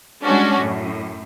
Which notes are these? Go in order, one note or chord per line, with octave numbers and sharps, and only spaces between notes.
G3 G#3 C#4 D4 F#4
F#2 A2